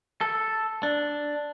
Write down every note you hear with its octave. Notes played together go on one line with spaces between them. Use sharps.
A4
D4